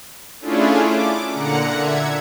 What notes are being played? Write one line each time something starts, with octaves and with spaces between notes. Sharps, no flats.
A3 C#4 D4 E4 F4 G#4
D6
A#2 D3 F#5 A#5 C#7
D3 E5 G#6